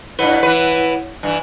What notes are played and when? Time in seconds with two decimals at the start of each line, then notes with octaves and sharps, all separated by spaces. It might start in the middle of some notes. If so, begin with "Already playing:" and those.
0.19 G2 B2 E4 B4 C#5 F#5
0.43 E3 B4
1.23 G2 E3 G#5